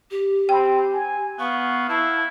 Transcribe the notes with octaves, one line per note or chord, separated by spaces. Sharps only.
G4
C4 G5 B5
G#5
B3 F5 C#6
E4 A5